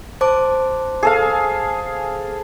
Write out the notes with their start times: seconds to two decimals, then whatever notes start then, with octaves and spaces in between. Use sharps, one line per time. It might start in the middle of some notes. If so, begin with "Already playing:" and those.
0.21 C5 A5 D6
1.03 G#4 A4 F5